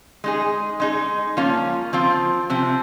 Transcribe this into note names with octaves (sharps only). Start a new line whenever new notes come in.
G#3 D#4 G#4
G#3 D#4 G#4
F3 A#3 C#4 F4
F3 C4 F4
C3 F3 C4